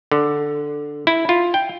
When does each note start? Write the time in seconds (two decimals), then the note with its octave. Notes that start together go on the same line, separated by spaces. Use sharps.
0.12 D3
1.07 E4
1.29 F4
1.54 G5